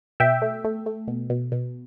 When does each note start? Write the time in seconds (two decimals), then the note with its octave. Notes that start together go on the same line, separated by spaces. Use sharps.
0.20 B2 E5 G5
0.42 A3
0.64 A3
0.86 A3
1.08 B2
1.30 B2
1.52 B2